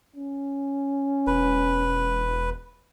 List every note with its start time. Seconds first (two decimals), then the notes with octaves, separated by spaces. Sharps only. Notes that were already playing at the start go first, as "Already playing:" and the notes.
0.16 C#4
1.27 E1 B4